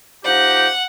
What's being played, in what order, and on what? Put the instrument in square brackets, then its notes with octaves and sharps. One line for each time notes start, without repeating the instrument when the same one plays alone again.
[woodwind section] F3 D#4 G4 [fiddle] F#5